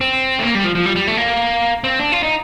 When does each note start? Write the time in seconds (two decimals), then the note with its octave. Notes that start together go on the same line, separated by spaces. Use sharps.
0.01 C4
0.39 A3
0.43 A#3
0.55 G3
0.64 F3
0.75 F3
0.86 G3
0.96 G3
1.07 A3
1.17 A#3
1.84 C4
1.99 D4
2.12 F4
2.23 D#4